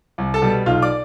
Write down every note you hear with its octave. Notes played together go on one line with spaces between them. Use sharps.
C2
A4 A5
B2 G3
B1 F4 F5
D5 D6